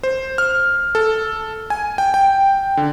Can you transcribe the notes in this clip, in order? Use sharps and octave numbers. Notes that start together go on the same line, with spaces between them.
C5
F6
A4
G#5
G5
G5
D3